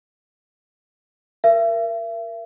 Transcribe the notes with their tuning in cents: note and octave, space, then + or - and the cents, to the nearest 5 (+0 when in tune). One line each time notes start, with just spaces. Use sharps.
A#4 +5 E5 +35